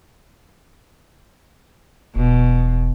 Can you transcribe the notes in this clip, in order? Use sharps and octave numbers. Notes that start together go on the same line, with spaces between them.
E1 B2